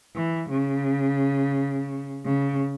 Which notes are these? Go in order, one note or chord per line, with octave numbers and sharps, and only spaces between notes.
E3
C#3
C#3